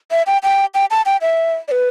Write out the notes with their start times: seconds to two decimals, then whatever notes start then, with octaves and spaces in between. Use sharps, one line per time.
0.11 E5
0.27 G5
0.43 G5
0.74 G5
0.91 A5
1.06 G5
1.22 E5
1.68 D5
1.71 B4